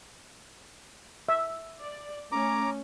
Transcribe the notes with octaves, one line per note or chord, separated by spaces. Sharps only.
E5
D5
A3 C#4 C#5 A#5 D6